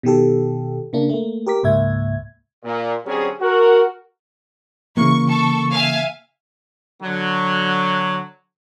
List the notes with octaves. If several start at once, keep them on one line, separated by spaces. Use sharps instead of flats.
B2 D#3 G4 A4
C#3 A#3 D4
A3 A#3
G4 A#4 D6 B6
C#2 G#2 A#3 E5 G#6
A#2
D3 F#3 G3 C4 C#4 G#4
F#4 A#4
C#3 E3 A#3 C#6
A4 C#6
E5 F5 G#5
D3 F#3